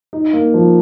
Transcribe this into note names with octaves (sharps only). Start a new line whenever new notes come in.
D#4
A#3
F3